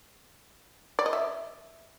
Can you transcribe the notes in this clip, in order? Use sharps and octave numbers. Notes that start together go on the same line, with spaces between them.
D5
D#5
E5